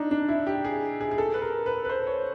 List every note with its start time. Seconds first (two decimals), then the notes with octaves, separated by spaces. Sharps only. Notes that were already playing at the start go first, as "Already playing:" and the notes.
Already playing: D4 D#4
0.11 D4
0.28 E4
0.47 G4
0.64 G#4
1.01 G#4
1.11 G#4
1.18 A4
1.34 B4
1.42 A#4
1.66 B4
1.85 B4
1.90 C5
2.07 C#5